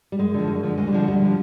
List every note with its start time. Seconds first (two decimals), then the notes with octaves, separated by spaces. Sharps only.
0.12 G3
0.19 F#2 G#3
0.34 D3 F3
0.48 F#2
0.63 D3 F3
0.78 D2 G#3
0.87 G3
0.93 D3 F3 G#3
1.07 D2 G3
1.21 D3 F3